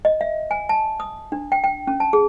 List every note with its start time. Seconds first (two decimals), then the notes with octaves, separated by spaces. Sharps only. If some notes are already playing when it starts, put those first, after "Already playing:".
0.05 D#5
0.21 E5
0.51 G#5
0.69 A5
1.00 D#6
1.32 D4
1.52 G5
1.64 G5
1.87 C#4
2.00 A5
2.13 G#4